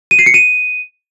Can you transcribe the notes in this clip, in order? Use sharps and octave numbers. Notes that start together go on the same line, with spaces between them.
D#7
C7
C#7
D#7